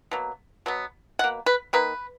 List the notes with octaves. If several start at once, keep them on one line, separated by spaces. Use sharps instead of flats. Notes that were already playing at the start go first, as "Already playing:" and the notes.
B2 F#3 A#3
B2 F#3 B3
B2 A#3 F#5
B4
D#3 A#3 B4